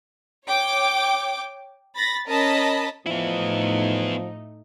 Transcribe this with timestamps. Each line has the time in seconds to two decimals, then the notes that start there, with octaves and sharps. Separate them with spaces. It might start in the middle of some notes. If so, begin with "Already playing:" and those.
0.47 C#5 G5 D6
1.96 B5 A6 A#6
2.26 C#4 A#4 D#5 A5 B5
3.06 A2 F3 A3 B3 D#4 E4